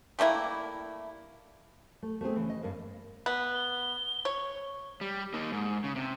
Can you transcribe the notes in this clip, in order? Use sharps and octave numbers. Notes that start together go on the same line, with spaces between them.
G3 A3 A#3 E4
A3
A3 B3 C4 G#4
C#3 E3
D#5
G2 A#3
B3
G7
C#5
G3
A#3 D#4
G#2
C#3
C3